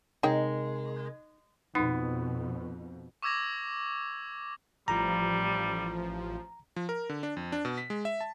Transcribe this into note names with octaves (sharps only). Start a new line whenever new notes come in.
C3 G#3 D#4 A#4 C#5 G5
F2 B2 B3 D#4
C#6 D6 E6 G#6 A#6 F7
A1 F3 G3 A#5
F3
A#4
D3
D4
F2
D4
B2
B6
G#3
E5
A5